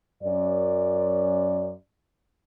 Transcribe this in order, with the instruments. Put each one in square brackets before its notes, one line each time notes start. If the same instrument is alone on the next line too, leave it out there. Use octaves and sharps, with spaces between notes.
[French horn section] F#2 D5